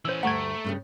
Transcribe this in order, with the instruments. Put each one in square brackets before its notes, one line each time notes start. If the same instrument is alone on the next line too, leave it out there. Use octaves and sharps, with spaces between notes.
[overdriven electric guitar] E3 C#4 [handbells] C5 E6 [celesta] F#7
[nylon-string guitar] D2 G2 [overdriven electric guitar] A3 [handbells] F#5 G#6 [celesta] A#5 C#6 D7
[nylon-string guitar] G2 C#3 G3